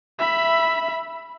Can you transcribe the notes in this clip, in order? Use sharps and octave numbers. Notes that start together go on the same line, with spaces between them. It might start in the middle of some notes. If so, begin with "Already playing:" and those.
E5 B5